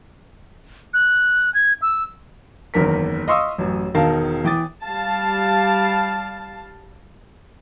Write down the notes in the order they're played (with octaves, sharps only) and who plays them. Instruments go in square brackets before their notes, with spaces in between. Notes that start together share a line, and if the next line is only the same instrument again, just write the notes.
[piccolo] F#6
G#6
E6
[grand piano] F#1 E2 D#3 A#4 B6
D#5 F5 C6 C#6 D#6 E6
A1 F#2
E1 D#3 A#4 F5 A5
E3 G5 D6 D#6 A6
[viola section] G3 F5 A5